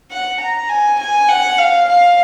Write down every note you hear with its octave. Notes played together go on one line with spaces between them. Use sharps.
F#5
A#5
G#5
G#5
F#5
F5
F5